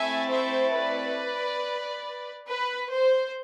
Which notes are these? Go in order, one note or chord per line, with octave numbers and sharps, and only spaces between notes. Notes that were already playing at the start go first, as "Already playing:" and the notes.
Already playing: A3 C4 E4 A4 E5 G#5
C5 E5
B4 D5
B4
C5